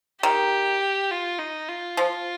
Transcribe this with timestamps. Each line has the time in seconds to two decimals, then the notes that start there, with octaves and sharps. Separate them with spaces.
0.23 D#3 G4
1.11 F4
1.39 D#4
1.69 F4
1.97 F3